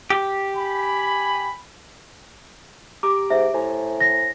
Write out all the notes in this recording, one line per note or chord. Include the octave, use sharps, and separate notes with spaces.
G4
G#5 B5
G4 A#5 D6 D7
G#2 E5
A2 C5 G#5 A#5
A#6